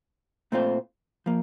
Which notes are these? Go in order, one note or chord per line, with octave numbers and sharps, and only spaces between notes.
A#2 A3 C4 F4 C5
F3 A#3